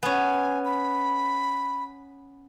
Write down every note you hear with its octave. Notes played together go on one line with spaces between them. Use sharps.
B3 C#4 G#5
B5